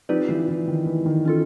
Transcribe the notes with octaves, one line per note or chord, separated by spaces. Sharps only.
F3 C4 D#4 G4 B4 D5
E3
E3
D#3
E3
D#3
C#4 F4 A4